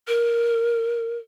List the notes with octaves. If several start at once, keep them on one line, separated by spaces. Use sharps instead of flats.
A#4